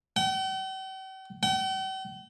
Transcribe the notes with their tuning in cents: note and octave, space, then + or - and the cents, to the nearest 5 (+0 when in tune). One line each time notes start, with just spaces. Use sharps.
G5 -45
G5 -45